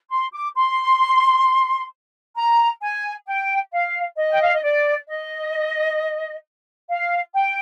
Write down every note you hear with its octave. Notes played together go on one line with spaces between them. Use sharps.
C6
D6
C6
A#5
G#5
G5
F5
D#5
G5
F5
D#5
D5
D#5
F5
G5